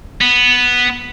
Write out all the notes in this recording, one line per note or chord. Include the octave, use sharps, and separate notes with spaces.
B3